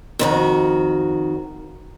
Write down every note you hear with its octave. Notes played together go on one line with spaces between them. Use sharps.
F2 D#3 F#4